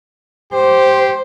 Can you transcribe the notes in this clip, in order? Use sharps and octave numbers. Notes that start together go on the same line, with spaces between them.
G4 C5